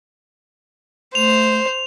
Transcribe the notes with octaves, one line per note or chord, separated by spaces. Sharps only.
A3 C5 F7